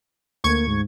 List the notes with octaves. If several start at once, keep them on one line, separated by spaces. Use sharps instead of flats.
D2 A#3 C#6 G#6
G#2